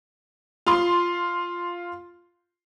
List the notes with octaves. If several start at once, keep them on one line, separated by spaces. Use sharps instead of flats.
F4 C6